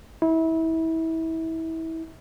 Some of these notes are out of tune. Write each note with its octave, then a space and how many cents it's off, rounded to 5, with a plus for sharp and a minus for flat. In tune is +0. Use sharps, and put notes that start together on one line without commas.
E4 -30